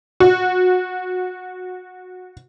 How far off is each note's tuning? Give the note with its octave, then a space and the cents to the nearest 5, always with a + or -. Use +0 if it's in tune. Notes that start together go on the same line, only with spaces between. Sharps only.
F#4 -20